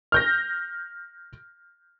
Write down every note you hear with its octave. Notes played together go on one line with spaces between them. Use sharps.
F6 G6 A#6